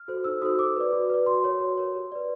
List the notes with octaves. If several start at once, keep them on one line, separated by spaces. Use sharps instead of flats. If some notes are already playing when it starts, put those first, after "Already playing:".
Already playing: F6
F#4 A4 C5
D#4 E6
F#4 A4 C5 D#6
F#4 D6
B4 D5
F#4
B4 D5
F#4 C6
A#4 C#5
F#4
A#4 C#5
G4
B4 D5